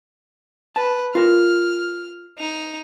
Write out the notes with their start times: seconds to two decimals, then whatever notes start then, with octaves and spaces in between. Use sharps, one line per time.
0.76 B4 A5
1.15 F4 A#4 F6
2.39 D#4 F7